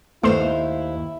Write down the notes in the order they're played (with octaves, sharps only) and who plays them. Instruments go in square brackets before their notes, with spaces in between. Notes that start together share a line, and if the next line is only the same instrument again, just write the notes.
[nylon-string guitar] D#2 C5 F5 [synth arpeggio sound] A3 C6 E7 [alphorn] E4